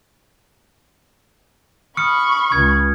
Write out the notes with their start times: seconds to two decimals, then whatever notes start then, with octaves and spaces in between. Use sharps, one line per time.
1.97 B5 C#6 D#6 F6 C#7
2.52 C#2 G#6